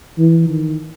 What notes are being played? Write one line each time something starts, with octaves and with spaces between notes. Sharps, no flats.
E3
D#3